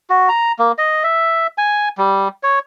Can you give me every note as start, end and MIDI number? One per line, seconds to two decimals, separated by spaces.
0.10 0.29 66
0.29 0.52 82
0.59 0.72 58
0.78 1.03 75
1.04 1.47 76
1.58 1.89 80
1.98 2.28 55
2.43 2.59 73